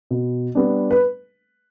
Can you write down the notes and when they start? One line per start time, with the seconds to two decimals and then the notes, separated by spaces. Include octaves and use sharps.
0.11 B2
0.55 G3 B3 D4
0.91 B4